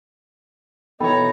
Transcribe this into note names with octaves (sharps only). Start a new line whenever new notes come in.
B2 E3 D#4 A4 C#5 G5 A#5 B5